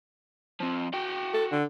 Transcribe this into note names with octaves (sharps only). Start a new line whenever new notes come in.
F3 C4
F#4 G5
A4
D3